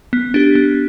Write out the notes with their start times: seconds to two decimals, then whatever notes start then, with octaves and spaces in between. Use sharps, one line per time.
0.13 B3
0.34 D4 G4
0.55 B3